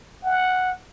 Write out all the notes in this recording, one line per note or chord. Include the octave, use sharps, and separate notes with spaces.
F#5